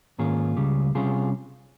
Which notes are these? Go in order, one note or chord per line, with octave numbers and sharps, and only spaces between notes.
G#2 D#3 A#3 C#4 F4 G#4
C#2 C#3 G3
C3 G3 C#4 F4 G#4